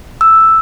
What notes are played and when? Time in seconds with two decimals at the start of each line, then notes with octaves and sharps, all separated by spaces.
0.21 E6